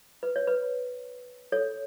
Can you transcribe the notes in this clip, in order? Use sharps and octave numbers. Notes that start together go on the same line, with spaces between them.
B4
C#5
B4
A4 C#5